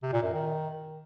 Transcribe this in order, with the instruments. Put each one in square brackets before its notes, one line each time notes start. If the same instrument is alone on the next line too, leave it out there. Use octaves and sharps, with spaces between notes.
[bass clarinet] C3
A#2
F#2
D#3